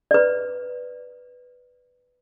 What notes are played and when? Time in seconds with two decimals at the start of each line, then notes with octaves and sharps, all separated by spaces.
0.11 B4 D5